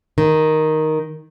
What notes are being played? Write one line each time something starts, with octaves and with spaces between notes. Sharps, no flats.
D#3